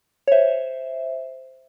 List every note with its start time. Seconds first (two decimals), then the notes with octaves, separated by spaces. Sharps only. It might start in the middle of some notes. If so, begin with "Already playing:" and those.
0.28 C#5
0.32 C5 E5